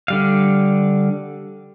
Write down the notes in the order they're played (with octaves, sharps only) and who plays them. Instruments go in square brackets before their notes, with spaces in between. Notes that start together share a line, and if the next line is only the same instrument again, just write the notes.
[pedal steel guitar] D3 G3 F5